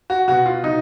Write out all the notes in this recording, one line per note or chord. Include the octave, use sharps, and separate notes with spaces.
F#4
B2 F#4
F4
B2 D#4